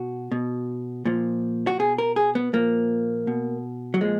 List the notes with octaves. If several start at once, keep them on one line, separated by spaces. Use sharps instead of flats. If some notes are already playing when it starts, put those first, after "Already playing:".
Already playing: B2 F#4
B2
A#2 F3
F#4
B2 G#4
A#4
G#4
B3
A#2 F3 A#3
B2
F#3
A#2 F3 G#3